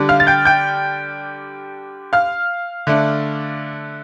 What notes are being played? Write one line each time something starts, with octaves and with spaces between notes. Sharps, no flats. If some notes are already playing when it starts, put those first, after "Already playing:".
Already playing: D3 G3 D4
F5 F6
A6
G5 G6
G5 G6
F5 F6
D3 A3 D4